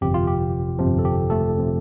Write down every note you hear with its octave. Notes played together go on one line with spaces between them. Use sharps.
G1 F2 C3 F3 G4
F4
G4
G1 F2 C3 F3
A4
G4
A3 A4
C3 F3